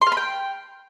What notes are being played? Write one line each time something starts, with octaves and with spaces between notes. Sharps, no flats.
C6
F5
B5
G5